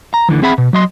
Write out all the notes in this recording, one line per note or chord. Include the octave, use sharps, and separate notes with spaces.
A#5
D2 D3 E3 F3
C4 G#4 E5 F#5 B5
B2
F#3 D#5 C6